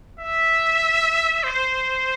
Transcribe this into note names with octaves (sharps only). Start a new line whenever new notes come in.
E5
C5